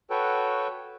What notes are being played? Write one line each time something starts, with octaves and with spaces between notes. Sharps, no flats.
F#4 A4 B4 C#5 G5